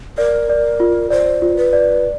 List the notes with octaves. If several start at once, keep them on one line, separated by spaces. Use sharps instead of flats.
A#4 D5
D5
F4
C5 D5
F4
B4
D5